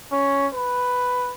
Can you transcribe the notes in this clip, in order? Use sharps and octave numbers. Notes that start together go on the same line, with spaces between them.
C#4
B4